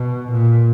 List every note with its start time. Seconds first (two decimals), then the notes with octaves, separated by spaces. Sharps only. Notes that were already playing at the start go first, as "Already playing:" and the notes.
Already playing: B2
0.32 A#2